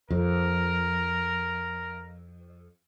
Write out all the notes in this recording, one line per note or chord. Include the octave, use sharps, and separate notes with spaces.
F2 A#4